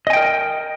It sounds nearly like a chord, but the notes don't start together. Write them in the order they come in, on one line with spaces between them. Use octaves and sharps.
D#5 G#5 G5 A#4